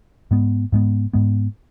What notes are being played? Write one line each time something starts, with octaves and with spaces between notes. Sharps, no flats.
G#2 G#3 B3
G#2 G#3 B3
G#2 G#3 B3